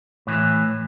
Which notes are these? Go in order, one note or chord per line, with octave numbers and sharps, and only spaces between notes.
A2 E3